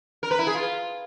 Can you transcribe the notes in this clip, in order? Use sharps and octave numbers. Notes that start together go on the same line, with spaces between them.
A#4
B4
E4
G#4
F4